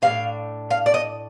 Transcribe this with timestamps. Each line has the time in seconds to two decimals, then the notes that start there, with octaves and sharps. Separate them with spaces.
0.02 A2 G3 D4 F5
0.70 F5
0.86 D5
0.94 D#5